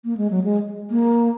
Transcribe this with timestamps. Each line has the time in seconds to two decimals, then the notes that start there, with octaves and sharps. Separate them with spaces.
0.05 A#3
0.17 G#3
0.31 F#3
0.44 G#3
0.91 A#3